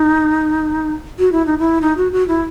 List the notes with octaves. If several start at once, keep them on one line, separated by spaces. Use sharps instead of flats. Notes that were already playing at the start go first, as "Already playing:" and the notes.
Already playing: D#4
F#4
E4
D#4
E4
D#4
F#4
F#4
E4